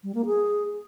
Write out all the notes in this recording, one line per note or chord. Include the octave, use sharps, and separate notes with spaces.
G3
A#3
G#4